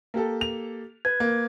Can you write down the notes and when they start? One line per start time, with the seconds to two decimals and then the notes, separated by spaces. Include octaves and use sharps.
0.14 A#3 G4 A4
0.41 F7
1.05 B4 G#6
1.20 A#3